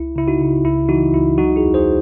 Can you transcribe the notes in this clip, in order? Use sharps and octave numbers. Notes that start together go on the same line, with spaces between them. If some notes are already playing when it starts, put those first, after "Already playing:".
Already playing: C#2 E4
C#3 E4
D#4 F#4
C#3
C#2 E4
E3 D#4 F#4
C#2 E4
F#3 D#4 F#4
E4 G#4
E2
G#4 C5